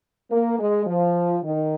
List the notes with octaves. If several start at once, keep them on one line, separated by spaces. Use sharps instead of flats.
A#3
G#3
F3
D#3